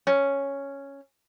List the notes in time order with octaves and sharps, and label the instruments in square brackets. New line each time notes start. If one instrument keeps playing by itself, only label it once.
[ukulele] C#4